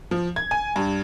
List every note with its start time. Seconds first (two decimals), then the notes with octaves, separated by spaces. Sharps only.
0.11 F3
0.36 G#6
0.51 G#5
0.76 G2